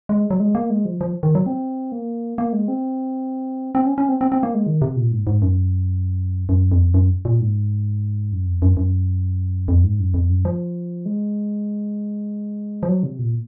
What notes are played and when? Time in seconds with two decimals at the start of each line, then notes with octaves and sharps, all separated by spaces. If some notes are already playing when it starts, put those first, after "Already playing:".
0.09 G#3
0.30 F#3
0.40 G#3
0.55 A#3
0.70 G#3
0.85 F3
1.01 F3
1.23 D#3
1.35 F#3
1.46 C4
1.92 A#3
2.38 A#3
2.53 G#3
2.68 C4
3.75 C4
3.86 C#4
3.98 C#4
4.09 C4
4.21 C4
4.32 C4
4.43 A#3
4.55 G#3
4.66 D#3
4.82 C3
4.97 A#2
5.12 G#2
5.27 G#2
5.42 F#2
6.49 F#2
6.72 F2
6.94 F#2
7.25 A#2
7.41 G#2
8.32 F#2
8.47 F2
8.62 F#2
8.77 F#2
9.68 F2
9.84 G#2
9.99 F#2
10.14 F2
10.30 F#2
10.45 F3
11.06 G#3
12.83 F3
12.88 F#3
13.03 C3
13.19 A#2